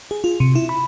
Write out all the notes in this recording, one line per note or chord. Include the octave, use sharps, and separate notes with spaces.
G#4
F4
C3
E4
B5